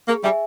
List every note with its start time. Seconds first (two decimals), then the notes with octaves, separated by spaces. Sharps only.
0.08 A#3 G#4
0.24 G3 E5 G#5